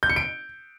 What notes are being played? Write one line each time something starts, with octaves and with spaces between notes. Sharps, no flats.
G6
C#7
D7